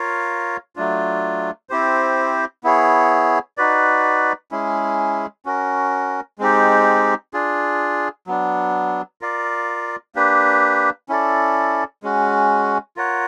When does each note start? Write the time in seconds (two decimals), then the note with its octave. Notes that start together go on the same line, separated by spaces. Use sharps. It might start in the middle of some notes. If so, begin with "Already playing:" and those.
Already playing: F4 A#4 C#5 F5
0.76 F#3 A3 D4 F4
1.69 C4 E4 G4 C5
2.64 B3 E4 G#4 C#5
3.58 D#4 F#4 B4 D5
4.51 G#3 C#4 E4 G#4
5.45 C#4 F#4 A#4
6.39 G#3 C4 D#4 G4
7.34 D4 F4 G#4
8.27 F#3 B3 D4
9.21 F4 A#4 D5 F5
10.15 A#3 D4 G4 B4
11.09 C#4 E4 A4 D5
12.03 G#3 C#4 F#4
12.97 F4 A#4 C#5 F#5